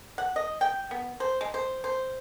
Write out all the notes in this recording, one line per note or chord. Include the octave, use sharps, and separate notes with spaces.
F#5
D#5
G5
B3
C5
G#3
C5
C5